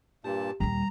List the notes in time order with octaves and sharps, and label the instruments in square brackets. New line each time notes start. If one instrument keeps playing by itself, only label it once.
[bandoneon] G2 A#2 A5 [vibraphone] G4
[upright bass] D#2 A#2 [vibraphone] G3 [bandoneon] A#5